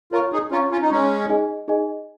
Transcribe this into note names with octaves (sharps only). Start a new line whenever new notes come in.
F4 A#4 C#5 A#5 C#6
D#4 G#4
C#4 F4 C#5 A#5 C#6
C#4 F4
D#4
G#3 C#4 C#5 A#5 C#6
D#4 G#4 D#5 G#5
D#4 G#4 D#5 G#5